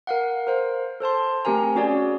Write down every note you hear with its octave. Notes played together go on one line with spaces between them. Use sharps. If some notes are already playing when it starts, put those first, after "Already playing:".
A#4 F5 F#5
A#4 C5 F5
A4 C5 A5 C6
A3 C4 G4 A#4 G#5 A#5
C#4 F#4 G#4 C#5 D5